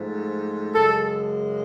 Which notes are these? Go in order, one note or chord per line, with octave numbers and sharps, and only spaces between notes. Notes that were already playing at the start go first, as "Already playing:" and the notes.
Already playing: G#2 F3 A3
F#2 C#3 G#3 A4